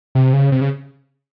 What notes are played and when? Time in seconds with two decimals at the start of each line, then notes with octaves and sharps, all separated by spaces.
0.15 C3
0.33 C#3
0.52 C3
0.61 C#3